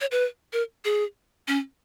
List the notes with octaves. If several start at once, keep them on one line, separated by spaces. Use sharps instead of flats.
C#5
B4
A#4
G#4
C#4